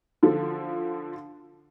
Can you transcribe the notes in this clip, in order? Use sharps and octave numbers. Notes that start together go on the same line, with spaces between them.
D3 F3 A4